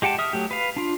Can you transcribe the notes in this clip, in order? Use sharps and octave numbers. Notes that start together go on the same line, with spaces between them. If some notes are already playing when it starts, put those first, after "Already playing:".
G#3 G4 F#5 G5 A5
E5 D#6 F6
F#3 A3 G4
B4 F5
D4 F4